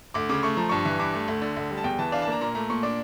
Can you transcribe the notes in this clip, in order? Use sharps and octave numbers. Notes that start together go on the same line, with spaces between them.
D2 D6
C#3 D6
A3 C#6
F3 A#5
G2 C#6
E3
G2 D6
A3
D2
D3
D2
G3
A5
E2 G5
E3 A5
D4 F5
A5
A#3 A#5
A#2 A#5
A3 A#5
A#2 C#6
D4 D6